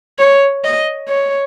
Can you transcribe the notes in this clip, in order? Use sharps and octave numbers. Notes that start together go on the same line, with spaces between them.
C#5
D#5
C#5